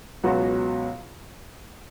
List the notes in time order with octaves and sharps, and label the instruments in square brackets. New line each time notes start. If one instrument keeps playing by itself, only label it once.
[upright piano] C#2 B2 F#3 B3 F#4